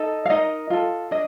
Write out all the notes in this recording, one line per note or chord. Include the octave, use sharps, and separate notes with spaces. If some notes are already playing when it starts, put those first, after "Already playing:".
Already playing: D#4 A4 D#5
F5
D#4 A#4 D#5
F4 A4
D4 D#5